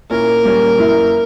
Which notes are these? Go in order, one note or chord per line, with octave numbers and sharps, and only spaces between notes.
A#2 A#3 C#4 E4 A#4
A#2 G3 A#3 C#4
F#2 E3 A#3 E4